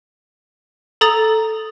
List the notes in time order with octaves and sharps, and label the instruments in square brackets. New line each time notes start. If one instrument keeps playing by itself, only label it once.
[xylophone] A4 A#5 D#6 A6